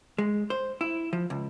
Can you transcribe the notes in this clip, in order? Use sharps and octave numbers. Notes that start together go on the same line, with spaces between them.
G#3
C5
E4
F3
C#2